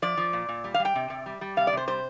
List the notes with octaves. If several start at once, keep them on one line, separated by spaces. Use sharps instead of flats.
F3 D5
F3
A#2
A#2
G3
F5
G3
G5
C3
C3
G3
G3
C3 F5
D5
C3 C5
G3 C5